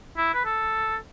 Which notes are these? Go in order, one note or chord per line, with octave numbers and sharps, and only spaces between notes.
E4
B4
A4